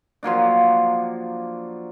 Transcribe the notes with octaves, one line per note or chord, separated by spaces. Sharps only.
F3 F#3 A#3 D4